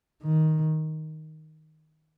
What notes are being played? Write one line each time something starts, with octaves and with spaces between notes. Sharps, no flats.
D#3